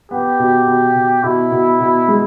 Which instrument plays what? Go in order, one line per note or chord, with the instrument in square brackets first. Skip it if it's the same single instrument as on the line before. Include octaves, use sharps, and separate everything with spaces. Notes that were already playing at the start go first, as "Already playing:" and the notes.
[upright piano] B3 [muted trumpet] G4
[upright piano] B2
B2
B2
[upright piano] B2 [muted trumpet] E4
[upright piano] B2
B2
G#3